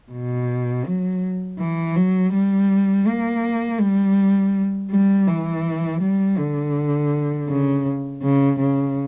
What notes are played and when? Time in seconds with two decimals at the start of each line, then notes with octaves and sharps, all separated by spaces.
0.12 B2
0.86 F#3
1.59 E3
1.96 F#3
2.33 G3
3.07 A#3
3.81 G3
4.91 G3
5.28 E3
6.01 G3
6.38 D3
7.49 C#3
8.22 C#3
8.60 C#3